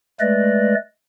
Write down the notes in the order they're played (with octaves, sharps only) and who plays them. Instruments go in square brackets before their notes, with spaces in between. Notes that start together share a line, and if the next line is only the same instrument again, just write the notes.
[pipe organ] G#3 A3 B4 D5 D#5